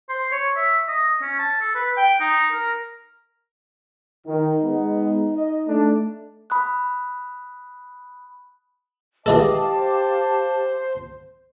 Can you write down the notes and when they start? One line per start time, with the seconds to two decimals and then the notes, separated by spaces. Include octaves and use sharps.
0.09 C5
0.32 C#5
0.56 E5
0.88 D#5
1.22 C#4
1.39 A5
1.61 A4
1.75 B4
1.97 G5
2.20 D#4
2.52 A#4
4.27 D#3 D#4
4.61 G#3 B3
5.35 D#5
5.67 A3 D4
6.50 B5 D#6 F#6
9.26 E3 G#3 G4 A4 D#5 F5 A5 D6
9.75 C5